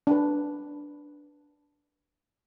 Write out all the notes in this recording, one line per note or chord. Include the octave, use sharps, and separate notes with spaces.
D4 B4